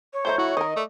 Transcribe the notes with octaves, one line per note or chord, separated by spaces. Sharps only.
C#5
F3 A3 D#4 C5 G6
E4 F#4
D#3 A#4 C5 D#5
A3 D5